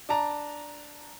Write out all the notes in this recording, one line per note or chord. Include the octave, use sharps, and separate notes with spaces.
D4 A5 A#5